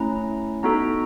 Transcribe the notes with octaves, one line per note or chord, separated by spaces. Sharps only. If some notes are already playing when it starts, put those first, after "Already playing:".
Already playing: A3 C#4 E4 A#5
B3 D#4 F#4 A4 A#5